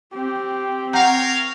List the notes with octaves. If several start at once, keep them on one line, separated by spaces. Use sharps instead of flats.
C4 G4
A#4 C#5 F5 F#5 A#5 G6